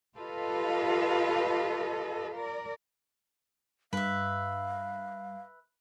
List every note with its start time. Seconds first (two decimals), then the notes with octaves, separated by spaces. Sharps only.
0.17 F4 G4 A4 B4 D#5 F5
2.35 A#4 D5
3.93 G2 B4 E5 F5